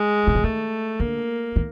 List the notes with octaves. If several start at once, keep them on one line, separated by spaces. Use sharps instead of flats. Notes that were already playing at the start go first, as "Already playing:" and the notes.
Already playing: G#3
C#3
D3
D#3 A3
D3 A#3
D#3